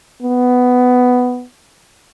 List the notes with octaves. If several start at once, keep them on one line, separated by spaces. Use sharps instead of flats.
B3